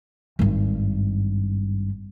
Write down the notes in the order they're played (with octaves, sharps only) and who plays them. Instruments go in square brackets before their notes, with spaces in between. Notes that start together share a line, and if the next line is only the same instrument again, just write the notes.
[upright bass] G#1 G2